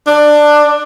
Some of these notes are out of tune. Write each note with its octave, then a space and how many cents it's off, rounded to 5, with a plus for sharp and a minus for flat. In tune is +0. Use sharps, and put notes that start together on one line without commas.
D4 +15